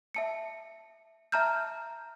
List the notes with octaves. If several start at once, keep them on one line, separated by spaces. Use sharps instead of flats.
E5 A5 C#7
E5 A5 A#5 F6 G6